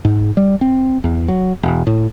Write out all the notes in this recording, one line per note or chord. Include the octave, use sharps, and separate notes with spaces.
G#2
G3
C4
E2
F#3
E1
A2